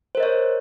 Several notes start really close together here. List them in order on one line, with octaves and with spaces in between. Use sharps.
C5 A#4 D#5 C#5